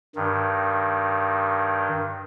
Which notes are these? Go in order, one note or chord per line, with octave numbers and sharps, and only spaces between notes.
G2 D#3